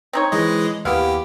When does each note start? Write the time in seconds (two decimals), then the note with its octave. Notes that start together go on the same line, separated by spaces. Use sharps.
0.13 C4 D#4 C#5
0.32 E3 G#3 D#5
0.85 D#2 B3 E4 G4 F5